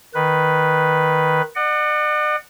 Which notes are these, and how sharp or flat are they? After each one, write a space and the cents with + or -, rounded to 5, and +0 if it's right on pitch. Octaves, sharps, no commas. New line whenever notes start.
D#3 +0 B4 +0
D5 +45 F#5 +0